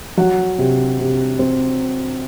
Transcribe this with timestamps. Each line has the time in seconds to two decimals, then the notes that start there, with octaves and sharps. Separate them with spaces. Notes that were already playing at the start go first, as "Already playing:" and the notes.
0.17 F#3 F#4 F#5
0.59 C3
0.99 C3
1.39 C4